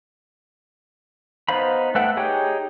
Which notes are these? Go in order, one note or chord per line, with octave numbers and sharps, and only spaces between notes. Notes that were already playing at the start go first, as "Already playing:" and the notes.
B3 D#4 C5 F5 B5
A3 B4 E5 F#5 G5
D#4 G4 G#4 C#5 G5